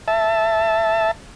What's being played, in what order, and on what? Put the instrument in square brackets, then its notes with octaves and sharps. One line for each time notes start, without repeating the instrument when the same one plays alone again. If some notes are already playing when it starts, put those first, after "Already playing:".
[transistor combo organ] E5 A5